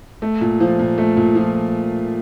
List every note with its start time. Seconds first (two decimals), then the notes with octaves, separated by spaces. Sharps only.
0.22 A3
0.41 A#2
0.60 F3
0.79 A#2
0.98 A3
1.17 A#2
1.35 F3